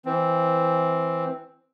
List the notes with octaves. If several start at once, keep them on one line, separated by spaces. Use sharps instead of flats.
E3 C4